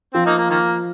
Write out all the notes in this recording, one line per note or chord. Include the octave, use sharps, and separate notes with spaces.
F3 C4
A#3 D#4
A#3
D#3 A#3